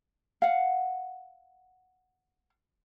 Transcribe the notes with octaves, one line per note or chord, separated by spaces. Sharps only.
F5 F#5